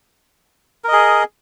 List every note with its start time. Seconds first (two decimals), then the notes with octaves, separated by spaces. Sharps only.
0.84 A#4
0.88 D#5
0.92 G#4